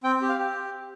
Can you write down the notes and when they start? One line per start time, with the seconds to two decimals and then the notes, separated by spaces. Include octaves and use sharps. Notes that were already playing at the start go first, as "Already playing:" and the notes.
0.03 C4 G5
0.22 G4
0.29 F5
0.39 G4